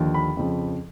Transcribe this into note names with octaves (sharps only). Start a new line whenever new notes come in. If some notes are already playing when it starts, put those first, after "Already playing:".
Already playing: D#2 D3 F3
B5
F2 C#3 F3